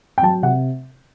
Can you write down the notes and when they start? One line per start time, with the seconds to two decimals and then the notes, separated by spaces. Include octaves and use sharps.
0.18 G5
0.22 F#3 A5
0.43 C3 F#5